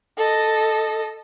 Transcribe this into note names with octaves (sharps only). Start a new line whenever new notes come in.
A4 D#5